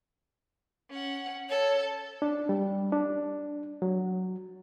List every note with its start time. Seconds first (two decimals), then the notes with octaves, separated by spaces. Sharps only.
0.90 C#4 F#5
1.49 A4 C#5
2.22 D4
2.49 G3
2.92 D4
3.82 F#3